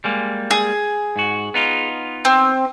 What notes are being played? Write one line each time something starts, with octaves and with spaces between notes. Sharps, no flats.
G3 G#3 A#3
G#4
G#2 F#4
B3 D#4 F4
C4